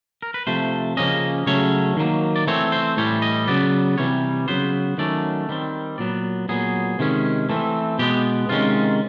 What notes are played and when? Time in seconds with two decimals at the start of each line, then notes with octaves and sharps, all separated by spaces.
0.22 A#4
0.34 B4
0.47 C3 F3 A3 C5
0.97 C#3 F3 A#3 C#4 D#5
1.46 C#3 F#3 A3 C#4 C#5
1.97 D#3 F#3 A#3
2.36 D5
2.47 E3 A3 C4 C#5
2.72 C5
2.97 A2 E3 G3 C#5
3.22 D#5
3.48 C#3 F#3 B3 D5
3.98 C3 E3 G3 C#5
4.48 C#3 F#3 B3 C5
4.98 D#3 F#3 A3 C#4 D5
5.49 D#3 G3 C4
5.98 A#2 F#3 B3 D5
6.49 A#2 F#3 B3 G#4
6.99 C3 D#3 G#3 C#4
7.49 E3 A3 C4
7.99 B2 G#3 B3 G4
8.49 C3 D#3 G#3 C#4 F4